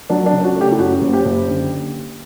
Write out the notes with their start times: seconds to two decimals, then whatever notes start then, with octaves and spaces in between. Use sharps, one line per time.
0.10 F#3 D4
0.26 D4
0.32 C#3
0.44 F#4
0.55 A3
0.61 G4
0.71 E4
0.79 F#2 F#4
1.01 F#1
1.13 G4
1.25 F#1
1.48 D3